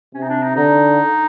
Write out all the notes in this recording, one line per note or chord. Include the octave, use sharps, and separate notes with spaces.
C3 C#4
D#4
D4
D#4
D3 D#4